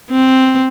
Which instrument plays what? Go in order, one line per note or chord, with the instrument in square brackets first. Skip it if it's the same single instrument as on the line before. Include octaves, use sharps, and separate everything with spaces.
[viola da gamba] C4